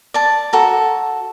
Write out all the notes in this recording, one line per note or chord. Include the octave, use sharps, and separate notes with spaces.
D5 A5
F#4 A4 A#5